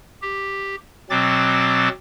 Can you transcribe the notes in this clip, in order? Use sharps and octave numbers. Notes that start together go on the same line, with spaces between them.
G4
B2 F#3 C4 D6 A6